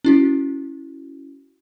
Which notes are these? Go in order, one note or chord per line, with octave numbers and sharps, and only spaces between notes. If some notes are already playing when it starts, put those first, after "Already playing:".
C#4 E4 F#4